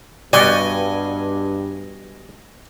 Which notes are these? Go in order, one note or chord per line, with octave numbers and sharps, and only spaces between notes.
G2 G3 B3 F#4 D5 D#5 G#5